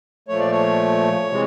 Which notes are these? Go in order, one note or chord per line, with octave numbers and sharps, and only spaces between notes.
A#2 F3 A3 C#5
D5
C#5
C3 E3 G#3